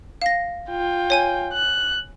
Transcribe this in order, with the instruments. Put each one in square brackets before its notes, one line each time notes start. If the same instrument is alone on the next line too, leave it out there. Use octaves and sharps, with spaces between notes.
[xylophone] F5 A#6
[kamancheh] F4 G5
[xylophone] C#5 G#5 D#7
[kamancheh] F#6